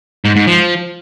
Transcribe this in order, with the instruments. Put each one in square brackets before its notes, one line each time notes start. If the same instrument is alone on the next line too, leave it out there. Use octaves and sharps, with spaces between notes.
[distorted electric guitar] G#2
G#2
F3